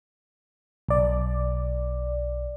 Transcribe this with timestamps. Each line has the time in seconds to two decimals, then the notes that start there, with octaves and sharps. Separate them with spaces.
0.89 B1 D5